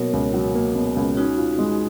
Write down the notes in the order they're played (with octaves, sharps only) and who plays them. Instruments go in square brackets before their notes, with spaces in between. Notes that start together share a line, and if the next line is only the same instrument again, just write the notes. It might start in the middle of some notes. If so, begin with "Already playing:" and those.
Already playing: [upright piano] B2 F#3 A#3 [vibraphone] A#4 C#5
[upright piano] C#2
F#3
A#3
B2
C#2
[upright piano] C#4 [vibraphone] D#4 F#4
[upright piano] F4
G#3